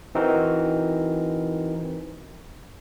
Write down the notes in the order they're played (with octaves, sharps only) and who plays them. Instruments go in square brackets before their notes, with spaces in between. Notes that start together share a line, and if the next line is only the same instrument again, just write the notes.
[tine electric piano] E3 C4 D#4 F#4 A#4